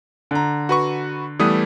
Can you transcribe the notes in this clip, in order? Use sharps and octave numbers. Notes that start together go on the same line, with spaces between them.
D3 A#5
F#4 B4 C#6
E3 G3 A3 B3 D#6